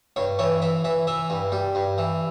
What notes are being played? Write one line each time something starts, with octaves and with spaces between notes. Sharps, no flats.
G2 C#5
E3 C#5
E3 E5
E3 E5
E3 E5
G2
G3
G2
E3